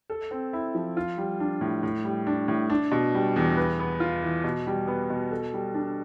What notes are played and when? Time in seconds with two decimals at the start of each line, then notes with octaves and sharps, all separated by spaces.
0.10 A4
0.31 C4
0.53 E4
0.75 F3
0.97 F4
1.17 G3
1.40 D4
1.61 A2
1.83 A2
2.04 G3
2.27 D4
2.48 A2
2.70 D4
2.91 B2
3.14 G3
3.36 E2
3.57 B4
3.80 B3
4.00 F4
4.23 E3
4.44 B2
4.67 G3
4.87 B3
5.10 B2
5.31 A4
5.53 G3
5.74 D4